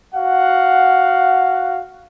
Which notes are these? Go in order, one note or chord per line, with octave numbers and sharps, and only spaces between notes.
F#4 F5 F#5